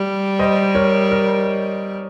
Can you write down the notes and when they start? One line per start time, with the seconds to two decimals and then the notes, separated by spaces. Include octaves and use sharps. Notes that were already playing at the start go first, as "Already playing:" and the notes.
Already playing: G3
0.39 C5 D#5
0.75 A#4 C#5
1.11 A#4